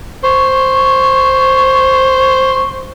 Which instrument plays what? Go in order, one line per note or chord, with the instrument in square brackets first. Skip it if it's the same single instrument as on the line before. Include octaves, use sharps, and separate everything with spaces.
[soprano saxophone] C5 [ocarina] C#6